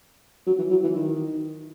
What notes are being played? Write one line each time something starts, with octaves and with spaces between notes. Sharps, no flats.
F#3
E3
F#3
E3
D#3